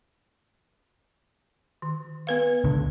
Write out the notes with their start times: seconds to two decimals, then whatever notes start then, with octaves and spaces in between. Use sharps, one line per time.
1.82 D#3
2.27 B3 B4 F5
2.64 C#2 D3